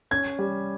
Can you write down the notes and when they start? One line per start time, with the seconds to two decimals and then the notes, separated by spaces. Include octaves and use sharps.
0.11 C#4 G#6
0.39 G3